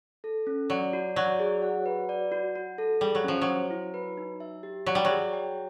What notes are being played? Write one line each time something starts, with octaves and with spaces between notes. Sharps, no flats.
A4
C#4
F#3 D5
F#4
F#3 D5
G#4
F#5
B4
D5
F#4
F#4
A4
G3 G#4
F#3
F3 C#4
F#3
C5
E4
B4
D#4
E5
G4
F#3 D5
G3
F#3 G#4
G5